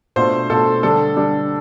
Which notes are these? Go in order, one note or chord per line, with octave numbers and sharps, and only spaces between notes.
B2 A3 D4 F4 C5
B2 A3 D4 F4 A4
D3 G3 D4 A4
D3 G3 D4